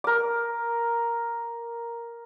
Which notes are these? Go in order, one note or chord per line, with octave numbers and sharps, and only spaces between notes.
A#4 D6